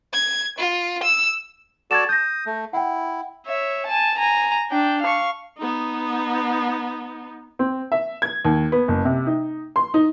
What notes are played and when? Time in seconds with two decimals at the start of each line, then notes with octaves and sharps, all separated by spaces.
0.14 G#6
0.59 F4
1.03 E6
1.91 F#4 A4 D5 G#6 A6 E7
2.09 D#6 G6 A#6
2.46 A3
2.73 E4 F#5 G5
3.47 C#5 E5
3.86 G#5 A5
4.18 G#5 A#5
4.70 D4 G5
5.02 F5 C#6
5.58 B3 D#4
7.59 C4
7.92 E5
8.22 G#6
8.45 D#2
8.72 B3
8.88 F#1
9.05 C3
9.26 D#4
9.76 C6
9.94 D#4